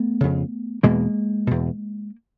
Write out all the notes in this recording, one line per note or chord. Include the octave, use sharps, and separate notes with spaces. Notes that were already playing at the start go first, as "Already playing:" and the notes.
Already playing: A3 B3
F2 C#3
E2 B2 G#3 A#3
E2 B2